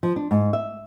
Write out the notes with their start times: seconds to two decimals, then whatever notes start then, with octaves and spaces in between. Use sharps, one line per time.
0.03 F3
0.16 D4
0.31 G#2
0.53 E5